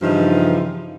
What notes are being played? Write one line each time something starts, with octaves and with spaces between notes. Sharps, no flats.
G2 C#3 E3 F3 D#4